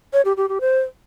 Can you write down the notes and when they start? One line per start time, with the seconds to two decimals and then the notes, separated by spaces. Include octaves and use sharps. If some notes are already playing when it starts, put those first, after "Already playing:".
0.13 C#5
0.25 G4
0.37 G4
0.49 G4
0.61 C5